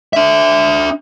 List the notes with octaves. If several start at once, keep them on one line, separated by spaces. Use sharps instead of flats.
D4 E5